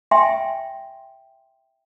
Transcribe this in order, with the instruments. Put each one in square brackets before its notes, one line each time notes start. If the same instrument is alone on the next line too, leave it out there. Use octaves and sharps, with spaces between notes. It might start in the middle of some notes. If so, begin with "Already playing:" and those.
[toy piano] E5 G5 G#5 C6